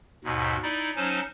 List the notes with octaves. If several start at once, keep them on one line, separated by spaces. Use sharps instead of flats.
D#2 G#2 B2
D#4 E4 D5
F#3 C#4 D#4 C5 A5